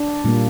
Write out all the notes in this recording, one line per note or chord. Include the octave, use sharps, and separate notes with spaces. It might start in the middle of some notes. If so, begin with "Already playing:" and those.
Already playing: D4
A#2 G3 A#3